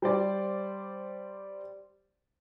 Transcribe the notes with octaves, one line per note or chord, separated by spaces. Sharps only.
G3 C5 D5